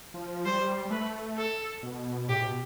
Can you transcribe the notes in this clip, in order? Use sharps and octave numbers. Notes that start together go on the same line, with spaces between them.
F3
G3 C5
G3
A3 B4
A4
B2
A2 G4
B2